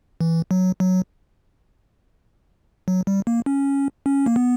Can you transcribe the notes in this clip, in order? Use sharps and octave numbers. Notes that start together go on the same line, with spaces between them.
E3
F#3
F#3
F#3
G3
A#3
C#4
C#4
A#3
B3